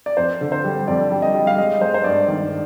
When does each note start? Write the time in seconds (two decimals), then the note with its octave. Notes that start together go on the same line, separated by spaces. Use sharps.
0.06 D5
0.17 F2 C5
0.41 D3
0.52 C5
0.64 G3
0.88 F2 D5
1.11 G3
1.22 D#5
1.34 G3
1.47 F5
1.58 G#3 D#5
1.81 G#3 C5
1.94 C5
2.04 G2 D5
2.28 D#3 D5